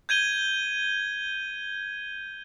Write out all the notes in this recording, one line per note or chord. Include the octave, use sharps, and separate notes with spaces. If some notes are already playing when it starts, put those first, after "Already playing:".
G6 G#6 D#7 G7